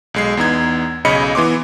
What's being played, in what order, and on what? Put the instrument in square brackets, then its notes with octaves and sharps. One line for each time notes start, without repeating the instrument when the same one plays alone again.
[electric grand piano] B1 G#3 C7
E2 B3 D#4 G#6
B1 C#3 C#5 D#5 B5 C#7
E3 B3 C6 D6